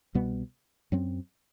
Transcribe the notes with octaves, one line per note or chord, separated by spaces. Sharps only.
C2 B2 G3 B3
F#2 F#3 C4